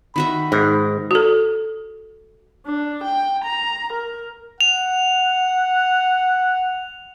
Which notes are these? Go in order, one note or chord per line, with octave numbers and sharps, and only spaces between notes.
D#3 F#4 E5 B5
G#2 A#4
F#4 A4
D4
G5
A#5
A#4
F#5 F7